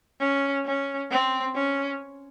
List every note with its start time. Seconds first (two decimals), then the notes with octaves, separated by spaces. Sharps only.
0.20 C#4
0.66 C#4
1.11 C4
1.55 C#4